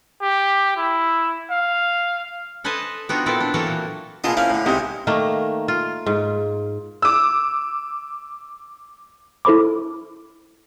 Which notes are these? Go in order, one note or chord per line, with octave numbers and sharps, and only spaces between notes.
G4
E4
F5
A4 B4 C5 D#5 G#5 A5
B3 C4 D4 D#4 F4 F#4
A#2 B3 C4 E4 A4 D5
D4
E3 F#3 A#3 F#4 A4
A#2
A#2 B3 F4 G#4 D#5 A5
A#3 C#4 E4 C5 F5
A2 D3
C2 C3 G#3 C4 D#4 E4
D#3 A3 A#3
F4
G#2
D6 E6
E4 A4 C5 B5 D6